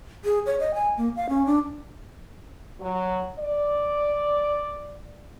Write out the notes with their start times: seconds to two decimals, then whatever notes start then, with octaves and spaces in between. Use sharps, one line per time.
0.25 G#4
0.46 C#5
0.60 D#5
0.74 G#5
0.97 A#3
1.16 F5
1.29 C#4
1.46 D4
2.79 F#3
3.38 D5